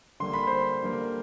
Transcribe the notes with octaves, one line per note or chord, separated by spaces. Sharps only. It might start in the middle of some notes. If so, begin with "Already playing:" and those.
D3 G3 A#3 C6
B5
C5 C6
D3 G3 A#3